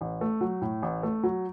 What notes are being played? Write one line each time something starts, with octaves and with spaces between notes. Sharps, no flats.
A1
A3
F#3
A2
A1
A3
F#3